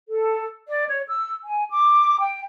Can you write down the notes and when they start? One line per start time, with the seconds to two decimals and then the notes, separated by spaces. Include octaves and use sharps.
0.09 A4
0.67 D5
0.88 C#5
1.09 E6
1.43 G#5
1.71 D6
2.19 G5